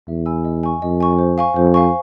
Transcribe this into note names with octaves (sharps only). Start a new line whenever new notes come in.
E2 E5
G#5 B5 E6
D#5
G#5 C#6
F2 D#5
G#5 C#6
C5
F5 G#5 C#6
F2 C5
F5 G#5 C#6